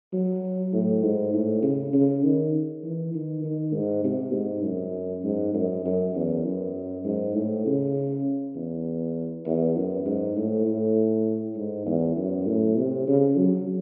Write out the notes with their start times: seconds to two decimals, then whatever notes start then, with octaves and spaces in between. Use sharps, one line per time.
0.13 F#3
0.73 A2
1.03 G#2
1.33 A2
1.63 C#3
1.93 C#3
2.24 D#3
2.83 E3
3.14 D#3
3.44 D#3
3.73 G#2
4.04 C3
4.34 G#2
4.64 F#2
5.24 G#2
5.54 F#2
5.85 F#2
6.15 E2
6.45 F#2
7.05 G#2
7.35 A2
7.66 C#3
8.56 E2
9.46 E2
9.76 F#2
10.06 G#2
10.37 A2
10.67 A2
11.56 G#2
11.86 E2
12.17 F#2
12.47 A2
12.77 C3
13.08 C#3
13.37 F#3